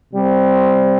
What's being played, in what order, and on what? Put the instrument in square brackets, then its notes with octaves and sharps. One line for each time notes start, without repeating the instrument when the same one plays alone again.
[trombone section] C3 G3 C4